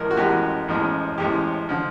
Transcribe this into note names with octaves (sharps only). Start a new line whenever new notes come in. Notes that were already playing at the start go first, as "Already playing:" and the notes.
Already playing: A1 A2 F3 G#3 A#4
F#4
A1 A2 F3 G#3 G4
A1 A2 F3 G#3
A1 A2 F3 G#3 G4
D3 F3